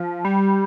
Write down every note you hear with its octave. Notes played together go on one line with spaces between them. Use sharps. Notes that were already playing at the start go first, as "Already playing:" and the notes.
Already playing: F3
G3